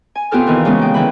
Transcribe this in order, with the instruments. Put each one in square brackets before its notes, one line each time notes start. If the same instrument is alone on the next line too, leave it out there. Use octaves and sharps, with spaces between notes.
[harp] G#5
C3 B3 F4 G4 A4 F6
A#2 D#3 E3
C#3 G#3 B3
A#3 G5
D3 E3 B5